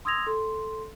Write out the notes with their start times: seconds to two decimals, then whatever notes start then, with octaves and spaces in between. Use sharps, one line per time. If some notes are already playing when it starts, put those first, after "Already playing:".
0.05 C6 D#6 E6 G#6 A#6 F7
0.27 A4 C6